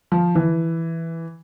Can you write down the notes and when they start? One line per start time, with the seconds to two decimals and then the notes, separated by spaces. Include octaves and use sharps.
0.12 F3
0.35 E3